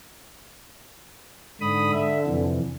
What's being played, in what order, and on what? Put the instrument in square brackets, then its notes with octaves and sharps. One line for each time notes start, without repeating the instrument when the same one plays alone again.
[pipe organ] G#2 B5 D#6 [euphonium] D3
[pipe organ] E5
F2 C3 E3